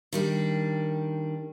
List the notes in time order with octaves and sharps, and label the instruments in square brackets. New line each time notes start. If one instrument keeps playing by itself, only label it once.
[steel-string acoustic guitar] D#3 G3 D4